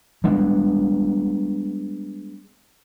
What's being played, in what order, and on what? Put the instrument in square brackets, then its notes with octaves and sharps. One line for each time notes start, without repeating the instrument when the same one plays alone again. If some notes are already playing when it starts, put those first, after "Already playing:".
[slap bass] G3 G#3 B3 D4